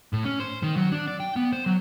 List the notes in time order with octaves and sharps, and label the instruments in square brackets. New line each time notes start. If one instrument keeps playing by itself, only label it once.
[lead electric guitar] A2
C#4
C5
D#3
F#3
D4
D5
G5
B3
C5
F#3